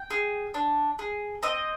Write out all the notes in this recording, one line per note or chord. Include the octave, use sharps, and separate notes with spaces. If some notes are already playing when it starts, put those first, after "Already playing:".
Already playing: G5
G#4
D4
G#4
C4 D#5